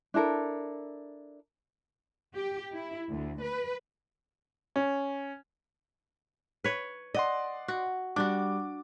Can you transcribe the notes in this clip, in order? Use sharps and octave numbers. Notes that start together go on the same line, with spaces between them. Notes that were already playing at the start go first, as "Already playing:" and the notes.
D4 E4 A4 A#4
G4
E4
D2
B4
C#4
B4 C#5
D5 D#5 F#5 C6
F#4
G3 D4 F#4 D6